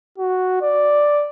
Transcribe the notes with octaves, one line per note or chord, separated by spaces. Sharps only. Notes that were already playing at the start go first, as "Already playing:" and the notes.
F#4
D5